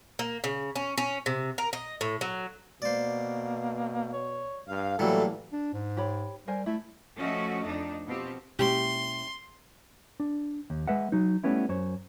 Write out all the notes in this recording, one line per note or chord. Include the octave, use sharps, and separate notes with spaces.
A#3
C#3
C#4
C#4
C3
A#4
D#5
A2
F#3
B2 A#3 C5 D5
C#5
G2 F5
A2 E3 F#3 G3 A3 A#3 A4 A5
D4
G#2
G4 C#5 B5
G3 A#4 C5 G#5
A3 E4
F3 A3 C#4 F#4 D#5
F2 D4 D#4
B2 F3 C4 G4
B2 G#3 A#3 C#4 E4 G4 C6
D4
D#2
G#3 B4 E5 F#5
F#3 D#4
G3 A3 B3 C#4 E4
F#2 C5 C#5